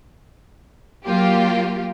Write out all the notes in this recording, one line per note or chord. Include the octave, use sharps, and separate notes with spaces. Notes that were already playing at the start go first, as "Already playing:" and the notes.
F#3 A#3 F4 G4